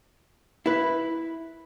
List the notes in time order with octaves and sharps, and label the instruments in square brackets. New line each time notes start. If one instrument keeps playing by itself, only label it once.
[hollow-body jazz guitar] E4 B4